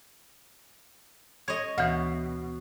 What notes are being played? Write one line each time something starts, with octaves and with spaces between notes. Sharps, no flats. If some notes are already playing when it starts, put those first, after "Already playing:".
C#5 D#5 G#6
D2 B2 E3